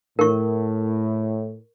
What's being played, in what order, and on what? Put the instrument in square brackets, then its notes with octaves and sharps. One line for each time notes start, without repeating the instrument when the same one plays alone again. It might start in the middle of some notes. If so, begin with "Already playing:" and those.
[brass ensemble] A2 [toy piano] A#4 C#6